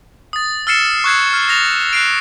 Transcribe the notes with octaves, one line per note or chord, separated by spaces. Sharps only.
D#6 A6
E6 F6 A6 C7 C#7 E7
C#6 F#6 G#6 C7
F6
F6 A6 A#6 F7
F#6 C7 D7